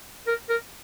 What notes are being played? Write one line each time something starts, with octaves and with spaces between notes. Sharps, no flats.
A#4
A#4